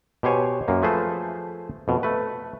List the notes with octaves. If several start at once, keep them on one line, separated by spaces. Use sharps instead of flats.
B2 G4 C5 C#5 G#5
F#2 A#3
F3 A3 G#4 B4 C5
F2 B2
A3 B4